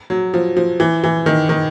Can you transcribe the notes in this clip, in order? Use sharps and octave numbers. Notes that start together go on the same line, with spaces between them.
F#3
F3
F3
E3
E3
D#3
D#3